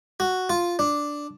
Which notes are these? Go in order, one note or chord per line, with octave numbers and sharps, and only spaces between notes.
F#4
F4
D4